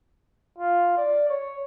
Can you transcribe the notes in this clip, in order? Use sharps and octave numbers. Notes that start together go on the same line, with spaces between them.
F4
D5
C#5